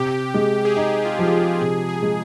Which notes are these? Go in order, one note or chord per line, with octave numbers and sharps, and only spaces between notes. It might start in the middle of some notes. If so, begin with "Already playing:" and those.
Already playing: C3 G4
G#3
G#4
D#4 G4
F4
F3 F4
G4
C3 G#4
G#4
G#3